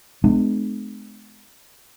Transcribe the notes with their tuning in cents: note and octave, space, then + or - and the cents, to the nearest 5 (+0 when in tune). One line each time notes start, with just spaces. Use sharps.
G#3 +35 B3 +45 D4 +45